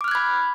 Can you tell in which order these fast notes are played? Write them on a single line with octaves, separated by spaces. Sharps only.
D6 F6 F#6 G#6 B5